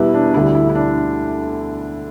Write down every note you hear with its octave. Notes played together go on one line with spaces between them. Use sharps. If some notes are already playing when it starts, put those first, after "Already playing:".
Already playing: E2 B2 G3 E4 B4
D4
D2 D3 G3 E4
E4
E4
D4